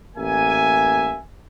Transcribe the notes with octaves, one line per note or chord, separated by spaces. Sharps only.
A1 A#3 E5 G#5